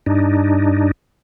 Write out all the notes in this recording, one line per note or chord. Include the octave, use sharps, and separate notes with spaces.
G2 D4 D#4